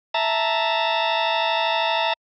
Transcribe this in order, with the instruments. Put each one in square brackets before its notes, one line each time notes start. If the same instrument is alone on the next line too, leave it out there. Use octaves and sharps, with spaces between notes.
[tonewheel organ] E5 A5 A#5